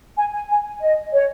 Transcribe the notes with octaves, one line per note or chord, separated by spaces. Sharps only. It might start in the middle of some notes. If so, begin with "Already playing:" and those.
G#5
G#5
G#5
D#5
C#5